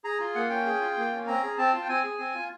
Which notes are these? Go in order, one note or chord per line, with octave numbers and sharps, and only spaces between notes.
G#4 A#5
F4
A#3 F#5
C#4 G5
G#4
F4
A#3
C#4
C4 A#5
G#4
C4 A5
F4
G5
C4 G#5
G#4
C4
F4